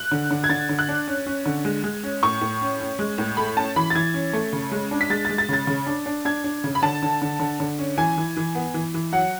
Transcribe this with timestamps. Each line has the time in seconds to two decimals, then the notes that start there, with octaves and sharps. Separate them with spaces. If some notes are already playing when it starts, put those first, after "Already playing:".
Already playing: F#6
0.12 D3
0.31 D3
0.44 G#6
0.49 D3 A6
0.69 D3
0.79 F#6
0.89 D4
1.08 C#4
1.27 C#4
1.46 D3
1.65 G#3
1.84 G#3
2.03 C#4
2.23 A2 C#6
2.41 A2
2.61 C#4
2.80 C#4
2.99 G#3
3.18 A2
3.37 A3 B5
3.56 C#4 A5
3.76 E3 B5
3.90 A6
3.95 E3 G#6
4.14 C#4
4.33 A3
4.53 C#3
4.72 G#3
4.91 D4
5.01 B6
5.10 G#3 A6
5.25 A6
5.29 G#3
5.38 A6
5.49 C#3 A6
5.67 C#3
5.87 D4
6.06 D4
6.25 D4 G#6
6.44 D4
6.64 C#3
6.75 B5
6.82 D3 A5
7.03 D3
7.22 D3
7.40 D3
7.60 D3
7.79 C#4
7.98 E3 G#5
8.17 E3
8.37 E3
8.55 B3
8.74 E3
8.94 E3
9.12 F#3 F#5